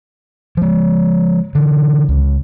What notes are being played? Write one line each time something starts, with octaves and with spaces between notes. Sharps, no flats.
F3 G#3
D3 E3
C#2